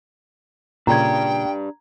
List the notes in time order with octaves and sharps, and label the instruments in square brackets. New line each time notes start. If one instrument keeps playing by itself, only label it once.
[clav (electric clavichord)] A#2 C#3 [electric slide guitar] D4 G4 D5 [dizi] G5 [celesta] A#5 G#6